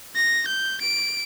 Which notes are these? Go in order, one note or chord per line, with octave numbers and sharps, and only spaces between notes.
A#6
G6
D7